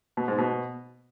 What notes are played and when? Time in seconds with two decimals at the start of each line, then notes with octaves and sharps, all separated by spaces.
0.17 B2
0.28 G#2
0.38 B2